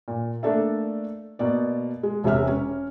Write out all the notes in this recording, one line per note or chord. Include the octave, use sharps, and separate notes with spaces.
A#2
A3 A#3 D4 A4 D5 E5
B2 A#3 D5
G#3
E1 C3 G#3 E5 F6
C#4